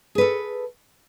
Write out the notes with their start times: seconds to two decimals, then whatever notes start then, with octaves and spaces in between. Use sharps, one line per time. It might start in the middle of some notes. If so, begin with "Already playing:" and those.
0.15 G#4
0.18 B4
0.21 A4